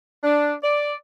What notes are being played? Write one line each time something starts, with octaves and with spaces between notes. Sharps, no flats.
D4
D5